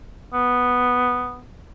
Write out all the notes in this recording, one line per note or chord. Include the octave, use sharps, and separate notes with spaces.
B3